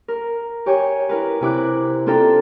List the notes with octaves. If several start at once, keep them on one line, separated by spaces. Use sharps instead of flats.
A#4
G4 C#5 G5 G#5
E4 A#4 B4
C3 E4 D6 F#6
C4 D4 F4 A4 G5 A#5